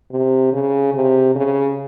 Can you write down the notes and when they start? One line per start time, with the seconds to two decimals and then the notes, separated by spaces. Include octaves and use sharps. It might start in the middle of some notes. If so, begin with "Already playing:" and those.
0.11 C3
0.53 C#3
0.94 C3
1.36 C#3